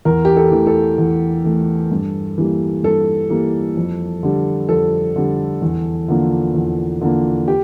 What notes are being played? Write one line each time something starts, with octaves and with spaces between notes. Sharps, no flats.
E2 A#4
G4
A4
E3 A3
A4
E2
E3 A3
G2
E3 G3 A#3
G2 A4
E3 G3 A#3
F2
D3 G3
F2 A4
D3 G3
E2
D3 F3 A#3
E2
D3 F3 A#3
G4